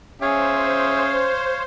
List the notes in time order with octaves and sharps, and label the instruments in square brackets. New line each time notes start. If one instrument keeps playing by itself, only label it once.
[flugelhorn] C#4 [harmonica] G#4 E5 [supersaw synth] C5 [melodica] C#5 F5